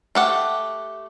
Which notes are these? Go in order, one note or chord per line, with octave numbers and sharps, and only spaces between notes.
A3 G4 F#5